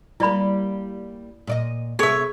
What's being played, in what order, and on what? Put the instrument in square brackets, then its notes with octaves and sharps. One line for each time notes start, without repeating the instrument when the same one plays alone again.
[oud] G3 A#3 [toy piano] E4 D5 B5
[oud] A#2 D5 D#5
[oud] C3 B3 [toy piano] G#4 A4 [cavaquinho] C#5 E5